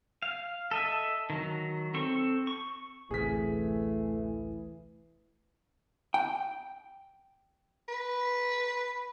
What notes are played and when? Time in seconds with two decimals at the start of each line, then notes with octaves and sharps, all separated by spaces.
0.23 F5
0.71 A4 D#5 E5
1.30 D#3 F#3
1.94 C4 A4 C#6
2.47 C#6
3.11 A1 D2 C3 E3 A3 G#4 B6
6.14 G5
7.88 B4